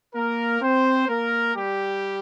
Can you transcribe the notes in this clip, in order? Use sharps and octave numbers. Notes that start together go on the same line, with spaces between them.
A#3 A#4
C4 C5
A#3 A#4
G3 G4